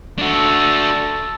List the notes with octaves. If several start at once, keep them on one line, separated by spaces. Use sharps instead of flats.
D4 F#4 A4